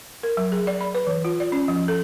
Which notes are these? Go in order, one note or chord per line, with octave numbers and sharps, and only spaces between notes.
A#4
F#3
G#4
D5
B5
B4
E3
F4
D5
C#4
F3
A4